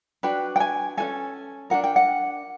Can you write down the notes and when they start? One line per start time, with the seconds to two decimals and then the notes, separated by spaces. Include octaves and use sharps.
0.23 D4 F#4 B4 G5
0.56 G5
0.60 G#5
0.97 C#4 F#4 A4 G#5
1.70 D4 F#4 A#4 F#5
1.84 G5
1.96 F#5